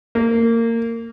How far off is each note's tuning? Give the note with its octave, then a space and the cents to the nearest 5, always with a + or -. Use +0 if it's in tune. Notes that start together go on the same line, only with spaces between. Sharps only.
A#3 -25